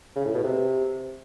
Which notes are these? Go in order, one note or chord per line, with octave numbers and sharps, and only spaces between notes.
C#3
A2
B2
C3